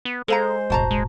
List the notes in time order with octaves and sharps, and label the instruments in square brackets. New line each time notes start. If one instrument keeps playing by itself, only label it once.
[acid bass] B3
[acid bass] G#3 [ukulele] A4 F5 A#5 [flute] C5
[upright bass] E1 A1 [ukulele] F#4 A5 A#5
[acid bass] G#3